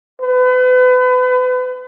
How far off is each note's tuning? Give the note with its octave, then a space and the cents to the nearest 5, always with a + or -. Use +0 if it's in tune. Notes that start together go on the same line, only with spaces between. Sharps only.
B4 +35